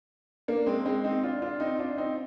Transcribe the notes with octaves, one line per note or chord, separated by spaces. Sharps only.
A#3 D4
G#3 C4
G#3 C4
C4 D#4
D4 F4
D4 F4
C4 D#4
D4 F4
C4 D#4